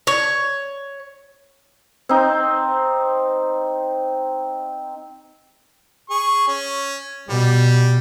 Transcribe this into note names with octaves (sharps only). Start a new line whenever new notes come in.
C#5
C4 D#4
G#4 C#6
C#4
B2 G3